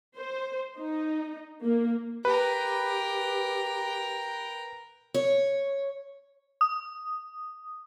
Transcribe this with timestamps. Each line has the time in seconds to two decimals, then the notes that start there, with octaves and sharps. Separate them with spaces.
0.17 C5
0.78 D#4
1.64 A#3
2.25 G4 A#4 B4 G5
5.14 C#5
6.61 D#6